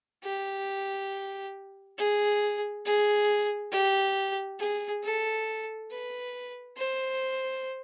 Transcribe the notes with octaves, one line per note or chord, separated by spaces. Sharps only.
G4
G#4
G#4
G4
G#4
A4
B4
C5